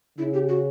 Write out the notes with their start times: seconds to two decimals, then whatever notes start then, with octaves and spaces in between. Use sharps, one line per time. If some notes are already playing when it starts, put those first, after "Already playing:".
0.18 C#3 E4
0.34 G4
0.49 F#4